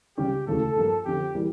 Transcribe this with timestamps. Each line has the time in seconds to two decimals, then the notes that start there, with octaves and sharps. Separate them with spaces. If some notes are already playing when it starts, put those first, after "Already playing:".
0.17 C#2 C#3 G3 C#4 G4
0.47 E1 D2 C#3 E3 A3 A4
0.76 G2 F3 A#3
1.06 F2 D3 F3 G4
1.35 E3 G3 A#3